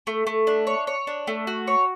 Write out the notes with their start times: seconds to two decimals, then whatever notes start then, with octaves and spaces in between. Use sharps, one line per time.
0.07 A3
0.27 A3
0.47 D4
0.67 C#5
0.87 C#5
1.07 D4
1.27 A3
1.47 F#4
1.67 C#5